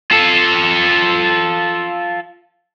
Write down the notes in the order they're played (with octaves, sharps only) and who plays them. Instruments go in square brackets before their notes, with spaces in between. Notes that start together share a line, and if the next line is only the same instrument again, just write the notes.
[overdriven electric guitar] F4 A4